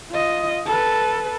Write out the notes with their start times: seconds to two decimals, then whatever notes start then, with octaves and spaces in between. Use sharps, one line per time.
0.11 F4 D#5
0.66 A4 B4